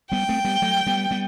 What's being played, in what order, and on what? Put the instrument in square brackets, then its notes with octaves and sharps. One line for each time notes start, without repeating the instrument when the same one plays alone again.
[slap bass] G3 B3 [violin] G5
[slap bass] A3 C4
G3 B3
F#3 A3
G3 B3
G3 B3